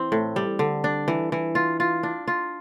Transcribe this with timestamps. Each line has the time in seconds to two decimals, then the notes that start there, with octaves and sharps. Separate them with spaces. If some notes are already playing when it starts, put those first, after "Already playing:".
Already playing: E3 C4
0.12 A2
0.36 G3
0.59 D3
0.84 D4
1.08 E3
1.32 E3
1.55 F4
1.80 F4
2.03 D4
2.27 F4